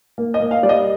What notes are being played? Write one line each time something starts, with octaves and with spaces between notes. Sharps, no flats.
A#3
D#5
A#3
F5
G3 D5
D#5